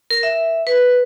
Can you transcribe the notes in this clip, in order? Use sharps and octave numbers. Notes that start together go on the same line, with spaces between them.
A#4
E5
B4